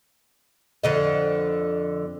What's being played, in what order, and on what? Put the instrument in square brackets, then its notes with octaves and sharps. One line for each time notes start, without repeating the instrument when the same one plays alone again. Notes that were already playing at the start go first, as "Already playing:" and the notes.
[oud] F2 D3 D#5